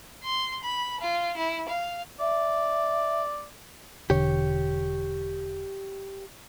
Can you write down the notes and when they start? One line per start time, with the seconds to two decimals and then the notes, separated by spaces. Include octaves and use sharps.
0.24 C6
0.64 B5
1.00 F4
1.37 E4
1.69 F5
2.20 D5 E5
4.10 E1 D3 G4 C#5